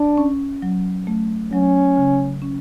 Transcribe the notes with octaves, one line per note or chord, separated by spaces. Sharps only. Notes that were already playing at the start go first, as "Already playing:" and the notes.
Already playing: D4
C#4
F#3
A3
F#3 C#4
C#3
C#4